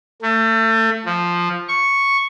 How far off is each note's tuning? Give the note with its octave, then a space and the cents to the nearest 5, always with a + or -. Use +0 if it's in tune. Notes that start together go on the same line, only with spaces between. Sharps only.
A3 +30
F3 +0
C#6 +0